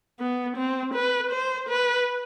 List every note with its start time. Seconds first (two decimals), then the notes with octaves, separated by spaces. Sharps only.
0.20 B3
0.57 C4
0.94 B4
1.31 C5
1.69 B4